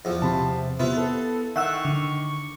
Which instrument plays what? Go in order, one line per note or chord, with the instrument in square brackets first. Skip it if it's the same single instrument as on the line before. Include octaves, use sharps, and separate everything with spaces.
[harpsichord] E2 F3
[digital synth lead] C3 [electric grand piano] A5 B5 C6
[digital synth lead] C3 [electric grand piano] B3 [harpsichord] E4 F4
[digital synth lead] A4
[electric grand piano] D#3 [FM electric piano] E5 F#5 E6 [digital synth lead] C#6
[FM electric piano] D3